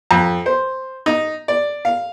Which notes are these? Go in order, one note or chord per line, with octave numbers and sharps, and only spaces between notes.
F2
C5
D#4
D5
F5